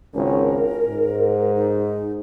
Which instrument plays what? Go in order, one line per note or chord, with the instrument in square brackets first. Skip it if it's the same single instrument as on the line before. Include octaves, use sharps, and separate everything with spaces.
[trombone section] G#1 C#2 C#4 [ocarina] A#4
[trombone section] G#2
[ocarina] D#4